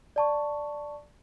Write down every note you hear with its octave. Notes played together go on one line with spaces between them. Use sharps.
D5 A5 C#6